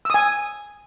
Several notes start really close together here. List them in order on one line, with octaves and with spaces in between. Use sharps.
E6 D#6 G#5